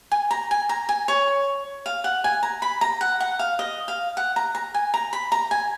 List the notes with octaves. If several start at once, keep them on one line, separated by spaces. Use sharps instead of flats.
G#5
A#5
G#5
A#5
G#5
C#5
F5
F#5
G#5
A#5
B5
A#5
F#5
F#5
F5
D#5
F5
F#5
A#5
A#5
G#5
A#5
B5
A#5
G#5